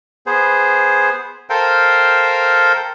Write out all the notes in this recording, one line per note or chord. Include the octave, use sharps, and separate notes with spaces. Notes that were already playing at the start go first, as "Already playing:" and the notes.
B3 G#4 C5
A4 A#4 C5 F5 G5